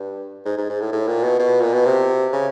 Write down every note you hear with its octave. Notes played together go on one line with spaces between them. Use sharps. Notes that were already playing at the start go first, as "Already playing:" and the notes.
Already playing: G2
G#2
G#2
G#2
A2
A2
A#2
B2
B2
A#2
B2
C3
C#3